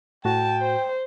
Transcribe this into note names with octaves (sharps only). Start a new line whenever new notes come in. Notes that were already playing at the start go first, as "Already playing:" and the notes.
A2 F#4 G5 A5
C5